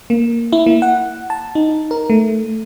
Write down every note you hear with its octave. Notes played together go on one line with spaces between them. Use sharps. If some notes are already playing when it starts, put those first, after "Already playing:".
A#3
E4
A#3
F#5
A5
D#4
A#4
A3